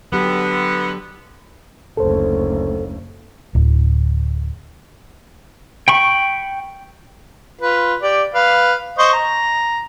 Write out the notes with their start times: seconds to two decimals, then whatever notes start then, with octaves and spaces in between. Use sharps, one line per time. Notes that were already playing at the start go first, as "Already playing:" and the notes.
0.12 D3 F#3 B3 G4
1.97 F#1 D2 A4 C5
3.55 D1
5.88 G5 B5 C#6
7.61 F4 B4
8.02 G4 D5
8.34 B4 F5
8.98 C5 D#5 C#6
9.13 A#5